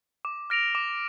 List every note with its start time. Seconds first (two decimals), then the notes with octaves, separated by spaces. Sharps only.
0.25 D6
0.50 F6 A#6 D7 F7
0.75 D6